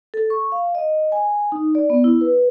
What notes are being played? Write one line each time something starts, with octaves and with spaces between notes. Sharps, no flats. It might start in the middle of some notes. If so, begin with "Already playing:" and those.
A4
C#6
F5
D#5
G#5
D#4
D5
B3
E4
B4